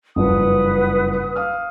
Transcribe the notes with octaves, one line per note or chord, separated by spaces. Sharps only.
F#1 G2 F3 B4 F#5 D#6
F5 D#6 F6